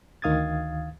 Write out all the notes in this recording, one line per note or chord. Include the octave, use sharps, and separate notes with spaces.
D2 D#3 F5 D#6 G#6 A6